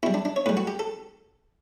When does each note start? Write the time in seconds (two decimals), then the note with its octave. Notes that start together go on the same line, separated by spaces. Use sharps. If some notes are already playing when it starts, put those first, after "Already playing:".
0.03 B2 G3 E4
0.14 D4
0.25 D4
0.36 C#5
0.46 A2 G3 B4
0.57 F#4
0.67 G4
0.79 A4